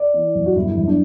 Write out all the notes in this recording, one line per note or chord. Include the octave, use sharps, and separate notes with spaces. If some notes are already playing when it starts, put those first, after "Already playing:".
Already playing: D5
E3
F#2
F#4
G1 E4
F#2
D4